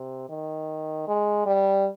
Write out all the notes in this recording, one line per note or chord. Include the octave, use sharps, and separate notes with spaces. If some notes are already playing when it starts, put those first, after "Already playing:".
Already playing: C3
D#3
G#3
G3